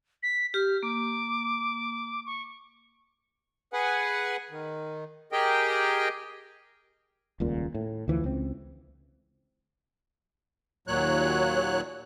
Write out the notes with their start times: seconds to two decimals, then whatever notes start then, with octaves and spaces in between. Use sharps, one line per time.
0.23 B6
0.54 G4 F6
0.83 A#3 D6
2.26 C#6
3.73 G#4 B4 F#5 G#5
4.50 D#3
5.32 G4 G#4 A#4 D#5 G5
7.40 D#1 C#2 A#2
7.75 A2
8.08 D2 E3 F3
8.24 C#2 C4
10.88 D#2 A#2 F#3 C#5 F#6